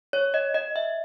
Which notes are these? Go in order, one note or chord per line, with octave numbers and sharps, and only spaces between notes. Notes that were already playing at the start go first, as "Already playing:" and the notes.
C#5
D#5
D#5
E5